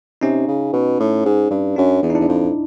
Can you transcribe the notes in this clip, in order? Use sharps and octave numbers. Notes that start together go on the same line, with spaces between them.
C3 C#4 D#4
C#3
B2
A2
G#2
G2
F#2 D4
E2
D#4
D4 E4
E2
F2